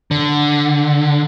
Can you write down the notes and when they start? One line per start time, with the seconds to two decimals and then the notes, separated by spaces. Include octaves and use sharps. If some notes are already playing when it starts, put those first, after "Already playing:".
0.11 D3